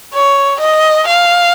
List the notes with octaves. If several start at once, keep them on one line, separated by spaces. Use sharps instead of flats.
C#5
D#5
F5